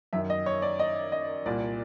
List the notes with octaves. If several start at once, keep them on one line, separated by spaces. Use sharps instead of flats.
F#2 D#3 E5
D#5
C#5
D5
D#5
D#5
C2 A#2 D5